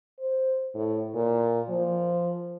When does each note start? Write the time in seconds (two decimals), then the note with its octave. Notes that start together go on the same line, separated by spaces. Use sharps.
0.19 C5
0.75 A2
1.15 A#2
1.69 F3